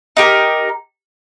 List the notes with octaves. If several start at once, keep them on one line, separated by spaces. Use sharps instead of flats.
D#4 G4 A#4